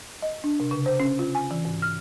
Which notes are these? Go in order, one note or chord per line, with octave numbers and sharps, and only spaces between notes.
D#5
D4
C3
C#3
C5
C#4
F4
G#5
E3
G#2
F6